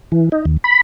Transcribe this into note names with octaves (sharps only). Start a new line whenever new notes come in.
E3
D#4
D#2
B5